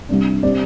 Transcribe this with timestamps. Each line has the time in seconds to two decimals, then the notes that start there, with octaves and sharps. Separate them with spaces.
0.09 C2 C3 G3 D4
0.43 C3 G3 C4 D5